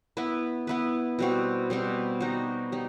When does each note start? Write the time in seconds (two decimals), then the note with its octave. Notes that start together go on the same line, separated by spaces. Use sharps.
0.17 B3 E4 B4
0.67 B3 E4 B4
1.19 B2 G3 C4 F#4
1.70 B2 G3 C4 F#4
2.21 G3 D#4 F#4
2.72 G3 D#4